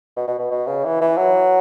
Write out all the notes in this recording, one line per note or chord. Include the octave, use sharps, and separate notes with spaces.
B2
B2
B2
B2
C#3
E3
E3
F#3